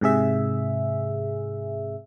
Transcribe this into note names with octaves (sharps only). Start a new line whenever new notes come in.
G#2 C3 G#4 E5